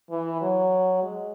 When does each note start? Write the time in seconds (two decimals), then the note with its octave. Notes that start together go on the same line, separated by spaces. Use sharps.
0.10 E3
0.41 F#3
1.03 G#3